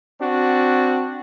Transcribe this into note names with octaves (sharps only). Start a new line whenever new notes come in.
C4 D4 F#4